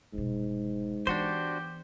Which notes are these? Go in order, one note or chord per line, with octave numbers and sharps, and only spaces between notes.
F1 G#2 B2
E3 B3 D4 F#4 G4 C5